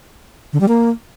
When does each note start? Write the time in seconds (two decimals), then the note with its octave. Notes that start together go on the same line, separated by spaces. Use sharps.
0.53 D3
0.60 G3
0.68 A#3